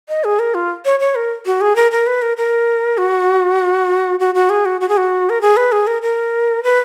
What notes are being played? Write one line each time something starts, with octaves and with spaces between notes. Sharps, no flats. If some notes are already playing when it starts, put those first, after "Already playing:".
D#5
G#4
A#4
F4
C#5
C#5
A#4
F#4
G#4
A#4
A#4
B4
A#4
A#4
F#4
F#4
F#4
G#4
F#4
F#4
G#4
F#4
A#4
G#4
B4
G#4
A#4
A#4
B4